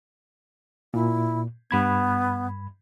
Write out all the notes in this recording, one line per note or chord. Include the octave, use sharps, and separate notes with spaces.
A#2 E4
G2 B3 B5 G#6